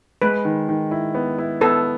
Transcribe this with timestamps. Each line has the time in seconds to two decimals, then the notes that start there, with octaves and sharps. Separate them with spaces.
0.22 G#3 B4
0.45 D#3
0.69 D#3
0.91 E4
1.15 B3
1.38 E4
1.61 B3 A4